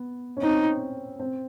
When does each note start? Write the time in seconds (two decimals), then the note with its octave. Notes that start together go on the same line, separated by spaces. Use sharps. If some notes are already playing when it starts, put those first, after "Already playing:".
Already playing: B3
0.37 C#4
0.42 C4 D#4
1.19 C4